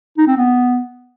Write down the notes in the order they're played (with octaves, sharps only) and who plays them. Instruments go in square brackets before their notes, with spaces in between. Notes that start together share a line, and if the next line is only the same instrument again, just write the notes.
[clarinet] D#4
C4
B3